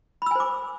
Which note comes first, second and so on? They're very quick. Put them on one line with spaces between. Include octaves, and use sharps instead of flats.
B5 E6 G#5 C5 D6